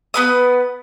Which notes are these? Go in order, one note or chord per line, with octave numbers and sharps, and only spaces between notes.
B3 B4 D#6